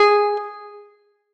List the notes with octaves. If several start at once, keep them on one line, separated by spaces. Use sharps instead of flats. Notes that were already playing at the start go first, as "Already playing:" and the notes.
Already playing: G#4